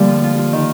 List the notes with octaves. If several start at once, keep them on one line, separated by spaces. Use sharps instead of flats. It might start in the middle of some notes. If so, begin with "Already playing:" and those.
Already playing: D3 F3 G3 A3 A#3 D4
F4
F4
F4
D#3